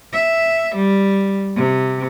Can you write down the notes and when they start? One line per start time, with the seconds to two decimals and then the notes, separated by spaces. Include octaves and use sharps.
0.14 E5
0.76 G3
1.57 C3